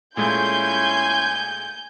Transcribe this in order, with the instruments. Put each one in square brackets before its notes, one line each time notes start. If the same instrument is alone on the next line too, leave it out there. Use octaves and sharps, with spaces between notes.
[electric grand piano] A#2 G#3 A3 [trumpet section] C#4 E4 C6 [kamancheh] G#5 [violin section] G6